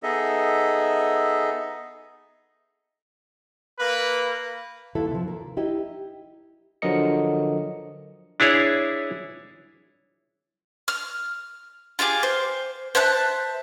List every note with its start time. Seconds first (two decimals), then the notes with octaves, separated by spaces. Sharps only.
0.03 B3 D#4 G#4 A4 D#5 E5
3.79 A#3 B4
4.95 D#2 E4 A4 E5
5.11 C3 F3
5.28 A#4
5.57 D#4 E4 G4 D#5
6.82 D3 F3 F#3 A#4 D#5 C#7
8.40 D4 E4 G#4 C#5
10.88 F6
11.99 F4 G4 G#4 D6
12.23 C5
12.95 C5 E5 A5 F#6